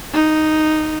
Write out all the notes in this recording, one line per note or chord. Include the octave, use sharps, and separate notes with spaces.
D#4